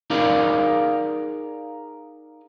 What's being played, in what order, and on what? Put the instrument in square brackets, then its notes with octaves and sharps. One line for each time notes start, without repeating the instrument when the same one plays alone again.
[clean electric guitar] D#4 G#4 A#4 D5 F5